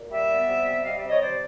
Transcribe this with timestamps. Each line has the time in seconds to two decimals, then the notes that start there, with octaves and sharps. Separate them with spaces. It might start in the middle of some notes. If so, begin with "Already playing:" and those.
Already playing: A#2
0.11 G3 D5 E5
0.29 B3
0.47 C3
0.66 G3
0.84 G3 D#5 F5
0.97 D5 E5
1.03 C3
1.09 C#5 D#5
1.22 D#3 C5 D5